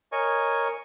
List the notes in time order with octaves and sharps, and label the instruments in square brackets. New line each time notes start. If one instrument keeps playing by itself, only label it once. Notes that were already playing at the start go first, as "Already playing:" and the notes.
[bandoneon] A#4 C#5 D#5 G#5 C#6